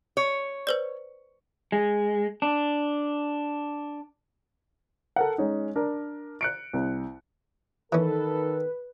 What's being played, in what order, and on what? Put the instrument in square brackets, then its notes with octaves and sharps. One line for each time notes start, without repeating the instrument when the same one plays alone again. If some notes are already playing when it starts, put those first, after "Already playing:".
[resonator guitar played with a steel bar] C#5
[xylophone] B4 C5 D5
[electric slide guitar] G#3
D4
[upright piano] A4 A#4 F#5
G#3 C#4 D#4
D4 A#4
F#6 C#7 D7
C2
[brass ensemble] D#3 A4 [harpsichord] E3 C#4 [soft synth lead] B4